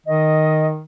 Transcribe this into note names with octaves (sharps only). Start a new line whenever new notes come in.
D#3 D#5